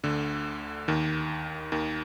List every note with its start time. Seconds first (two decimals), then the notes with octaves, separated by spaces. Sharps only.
0.04 D2 D3
0.88 D#2 D#3
1.72 D#2 D#3